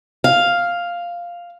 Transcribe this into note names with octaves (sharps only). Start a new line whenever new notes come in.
F5